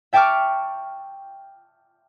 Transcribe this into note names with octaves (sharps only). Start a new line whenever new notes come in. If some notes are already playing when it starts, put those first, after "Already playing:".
E5 G5 A5 C#6 D6 F6